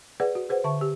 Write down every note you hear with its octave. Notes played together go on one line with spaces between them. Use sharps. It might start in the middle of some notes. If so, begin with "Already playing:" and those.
G#4 B4 D5 F#5
F#4
G#4 B4 C5 F#5
D3 E5 A5 C#6
G4